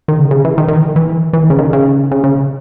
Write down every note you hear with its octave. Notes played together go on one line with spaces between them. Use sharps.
D#3
C#3
C#3
E3
D#3
D#3
E3
E3
E3
D#3
C#3
D#3
C#3
C#3
C#3